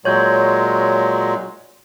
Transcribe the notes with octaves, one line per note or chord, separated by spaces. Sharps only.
A#2 F#3 G#3 C#5 G6